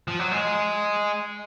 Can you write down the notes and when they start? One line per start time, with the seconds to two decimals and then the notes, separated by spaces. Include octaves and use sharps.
0.08 F3
0.19 F#3
0.32 G#3